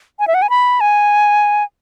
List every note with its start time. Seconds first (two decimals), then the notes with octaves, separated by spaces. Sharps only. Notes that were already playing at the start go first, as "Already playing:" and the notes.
0.20 G#5
0.28 E5
0.34 F#5
0.42 G#5
0.50 B5
0.80 G#5